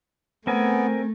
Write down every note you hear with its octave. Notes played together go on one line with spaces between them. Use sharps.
A3 B3 C4 A#4 G#5